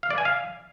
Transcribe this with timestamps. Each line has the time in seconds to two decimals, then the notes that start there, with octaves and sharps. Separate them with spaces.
0.03 F5
0.10 D5
0.18 G#5
0.25 F5